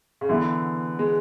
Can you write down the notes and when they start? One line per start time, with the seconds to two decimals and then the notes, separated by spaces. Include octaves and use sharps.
0.21 C#3
0.29 D3 E3 B3 E4
0.99 G#3